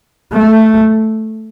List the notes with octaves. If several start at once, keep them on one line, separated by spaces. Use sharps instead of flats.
A3